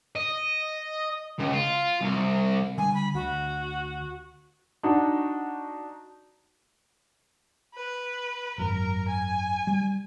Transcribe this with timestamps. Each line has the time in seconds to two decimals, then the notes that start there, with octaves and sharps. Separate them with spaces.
0.16 D#5
1.39 C#2
1.53 F4
2.01 C2
2.78 D3 G3 G#5
2.94 B5
3.14 D2 F#4
4.83 D4 D#4 F#4
7.75 B4
8.58 G#1 F#2 A#4
9.08 G#5
9.67 G3